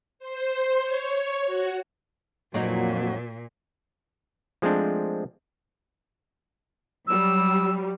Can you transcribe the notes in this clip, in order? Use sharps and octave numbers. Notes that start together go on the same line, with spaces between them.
C5
C#5
F#4
F2 A#2 F3 F#3 A#3 D#4 F#4
F3 G#3 A3 C4 D4
F#3 G3 E6